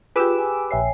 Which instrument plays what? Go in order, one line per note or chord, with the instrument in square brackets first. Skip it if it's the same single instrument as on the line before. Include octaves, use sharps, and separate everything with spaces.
[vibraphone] F4 [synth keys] G4 B4 [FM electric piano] G#4 D6 E6
[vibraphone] G#5
[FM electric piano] A#1 E5 C7 [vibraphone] C#5 G5 G#5